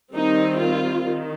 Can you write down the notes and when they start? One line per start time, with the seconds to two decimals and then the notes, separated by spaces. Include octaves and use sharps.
0.14 D#3 G3 C4 D#4
0.60 F4
1.06 D#3